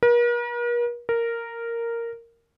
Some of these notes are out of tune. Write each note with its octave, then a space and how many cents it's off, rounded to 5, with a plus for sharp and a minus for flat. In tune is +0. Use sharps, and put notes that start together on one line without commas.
A#4 +45
A#4 -5